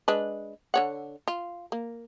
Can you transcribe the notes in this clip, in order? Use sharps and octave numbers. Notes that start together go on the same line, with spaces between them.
G#3 D4 B4
D3 C#5 F#5
F4
A#3